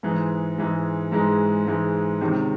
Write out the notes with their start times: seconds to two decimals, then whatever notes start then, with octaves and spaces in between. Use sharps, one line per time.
0.03 G#2 E3 G#3
0.58 G#2 E3 G#3
1.12 G#2 E3 G#3
1.67 G#2 E3 G#3
2.21 C#2 C3 D#3